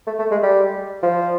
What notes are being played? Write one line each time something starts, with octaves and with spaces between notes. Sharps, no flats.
A3
A3
G#3
G3
F3